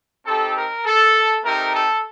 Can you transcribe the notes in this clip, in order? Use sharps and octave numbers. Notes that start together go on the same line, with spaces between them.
C4 D#4 G4 A4
A#4
A4
A3 C4 D#4 G4 A#4
A4